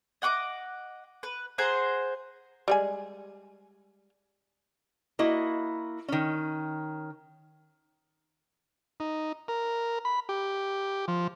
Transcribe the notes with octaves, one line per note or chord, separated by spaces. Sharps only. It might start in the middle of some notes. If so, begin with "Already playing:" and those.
D#5 F#5 C#6 D6
B4
G#4 C5 F#5 A#5
G3 G#3 G#5
A#3 E4 F#4 D#5
D#3 C#4
D#4
A#4
B5
G4
F3